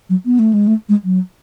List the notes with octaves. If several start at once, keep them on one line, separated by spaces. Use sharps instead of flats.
F#3
B3
A3
G#3
A3
G#3
F#3